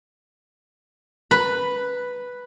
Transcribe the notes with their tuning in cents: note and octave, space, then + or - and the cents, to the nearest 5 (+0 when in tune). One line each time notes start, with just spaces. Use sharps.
B4 +0 B5 +0